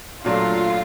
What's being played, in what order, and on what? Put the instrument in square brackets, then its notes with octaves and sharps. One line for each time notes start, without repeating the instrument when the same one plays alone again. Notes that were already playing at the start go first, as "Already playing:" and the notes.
[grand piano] A#2 F#3 A3 D4 [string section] F4